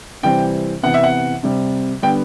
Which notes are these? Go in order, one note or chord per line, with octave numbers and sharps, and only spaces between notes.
C3 E3 G3 C4 G5
C3 E3 B3 F#5
E5
F#5
C3 G3 C4
D3 G3 B3 G5